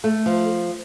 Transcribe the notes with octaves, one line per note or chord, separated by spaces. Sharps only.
A3
F3